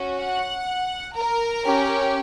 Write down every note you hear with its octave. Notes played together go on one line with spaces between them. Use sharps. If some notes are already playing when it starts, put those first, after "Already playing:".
Already playing: C#4 F#4
F#5 F#6
A#4 A#5
C#4 G4